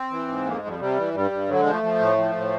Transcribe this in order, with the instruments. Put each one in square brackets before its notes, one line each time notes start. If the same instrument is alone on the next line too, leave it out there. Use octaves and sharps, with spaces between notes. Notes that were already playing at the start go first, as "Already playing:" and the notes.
Already playing: [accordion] C4
E3
G#2
F2 A#3
G#3
F2
G3
C3 G3
E3
G2 G3
G2
D3 F#3
G#3
F3
A3
F3
A2
F3
A2